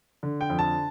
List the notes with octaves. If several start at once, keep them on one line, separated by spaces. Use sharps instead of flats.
D3
G5
F2
A5